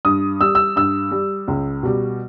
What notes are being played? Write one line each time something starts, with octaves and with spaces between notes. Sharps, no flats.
G2 D#6
G3 E6
E6
G2 E6
G3
C#2
B2 G3